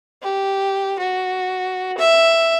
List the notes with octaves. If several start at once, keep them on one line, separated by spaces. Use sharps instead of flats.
G4
F#4
E5